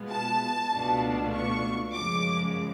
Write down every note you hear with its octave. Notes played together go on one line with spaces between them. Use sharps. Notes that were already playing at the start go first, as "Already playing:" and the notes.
Already playing: B2 G#3 B3 F4
A5
C#2 B2 A3 D4 F4
C#6
F#2 C#3 F3 G#3 D6